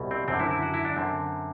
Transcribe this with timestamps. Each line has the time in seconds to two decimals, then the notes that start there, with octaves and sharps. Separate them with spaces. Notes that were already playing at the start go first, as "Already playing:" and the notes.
Already playing: C2 B2
0.11 C4
0.28 F#2 D3 C4
0.40 E4
0.51 E4
0.62 F#4
0.74 E4
0.85 D4
0.96 F#2 D3 C4